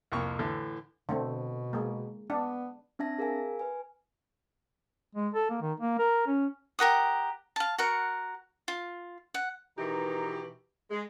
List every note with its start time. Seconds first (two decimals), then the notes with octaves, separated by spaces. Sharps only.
0.12 C2 F2 A#3 C#6
0.39 A2 D3 E3
1.09 B2 D3 A3 C4
1.73 G#3 A#3
2.30 B3 D4
2.99 C4 D4 E5 A5 A#6
3.19 G#4 A#4 F5 G#5
3.59 B4 G#5
5.15 G#3
5.34 A4
5.50 A#3
5.61 D#3
5.80 A#3
5.98 A#4
6.27 C#4
6.79 G4 A#4 F#5 D#6
7.56 F5 A5
7.78 F#4 A#4 F#5
8.68 F4
9.34 F#5
9.78 B2 D#3 E3 D#4 G4
10.90 G#3